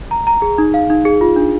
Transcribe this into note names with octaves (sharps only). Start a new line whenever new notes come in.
A#5
A#5
G#4
D#4
F5
D#4
G#4
F4
D4